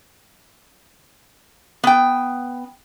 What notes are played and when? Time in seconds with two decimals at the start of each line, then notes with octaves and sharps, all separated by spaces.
1.84 B3 G5